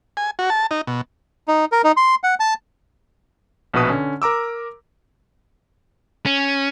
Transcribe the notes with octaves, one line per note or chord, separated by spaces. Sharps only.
G#5
F#4
A5
D#4
B2
D#4
A#4
D#4
C6
F#5
A5
A#1 B2 F#4 B4 D#6
D3 C#4
A#4 A#5 D6 E6
C#4